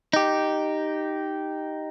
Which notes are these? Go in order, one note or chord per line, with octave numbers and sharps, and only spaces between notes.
D#4 G4